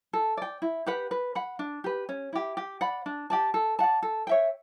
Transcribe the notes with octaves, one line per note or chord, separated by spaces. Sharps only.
A4
D5 G5
E4
G4 B4 F#5
B4
F#5 B5
D4
G4 B4
C#4
E4 G4
G4
D5 F#5 B5
D4
G4 D5 A5
A4
D5 F#5 A5
A4
C#5 E5 G5